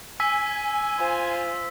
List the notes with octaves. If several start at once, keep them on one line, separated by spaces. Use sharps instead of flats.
G#5 E6 B6
F4 C5